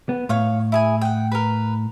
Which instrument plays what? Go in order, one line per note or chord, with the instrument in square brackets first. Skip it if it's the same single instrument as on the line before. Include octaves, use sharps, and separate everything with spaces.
[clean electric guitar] B3
[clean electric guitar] A2 [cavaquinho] C#5 F5 C#6
[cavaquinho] E4 G#4 G#5
F#5 G5
A#4 B4